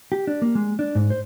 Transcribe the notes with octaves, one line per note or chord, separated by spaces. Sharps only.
G4
D4
A#3
G#3
D4
G#2
C5